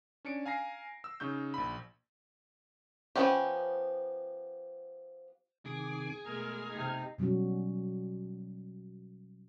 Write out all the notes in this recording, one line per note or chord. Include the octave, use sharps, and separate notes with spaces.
C#4 D4 C#7 D7
F5 G#5 A#5 A#6 C7
E6
C#3 D#4 C#6 E6 G6
A#1 B5
F3 F#3 B3 C#4 G4
C3 D#3 G#4 D6
B2 G#3 A3 A#4 F6 G#6
C3 D#4
B2 F#3 G3 C#4 F#4